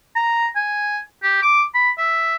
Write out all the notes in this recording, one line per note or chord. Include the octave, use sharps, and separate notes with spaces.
A#5
G#5
G4
D6
B5
E5